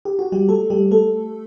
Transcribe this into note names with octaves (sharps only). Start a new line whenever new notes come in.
G4
F#4
G3 G4
A3 A4
G3 G4
A3 A4